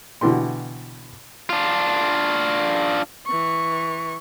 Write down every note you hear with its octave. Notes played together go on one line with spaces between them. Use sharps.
B2 D3 E3 G4 C6
D4 F4
E3 C#6